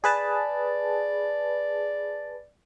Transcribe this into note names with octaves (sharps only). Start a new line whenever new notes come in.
G#4 B4 D5 A5